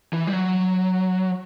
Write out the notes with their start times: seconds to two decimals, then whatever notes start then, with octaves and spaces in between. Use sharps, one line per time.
0.13 E3
0.27 G3
0.33 F#3